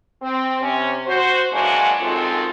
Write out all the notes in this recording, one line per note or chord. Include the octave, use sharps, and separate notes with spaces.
C4
C3 C#4
F#4 C5
E3 F#3 G#3 A#3 C#4 D4
F#2 D#3 G#3 C4 F4 A4